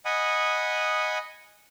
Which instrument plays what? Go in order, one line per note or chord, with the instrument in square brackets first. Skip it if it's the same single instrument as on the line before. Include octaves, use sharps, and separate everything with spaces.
[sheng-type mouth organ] D#5 F#5 G#5 B5 D#6